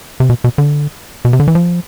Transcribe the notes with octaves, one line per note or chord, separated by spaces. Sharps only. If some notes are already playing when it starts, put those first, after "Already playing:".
C3
B2
B2
D3
B2
C3
D3
E3
F3